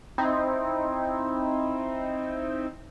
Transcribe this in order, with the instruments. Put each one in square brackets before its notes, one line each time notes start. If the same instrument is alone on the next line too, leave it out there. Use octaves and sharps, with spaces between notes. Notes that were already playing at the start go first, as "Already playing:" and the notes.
[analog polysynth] C4 D#4 E4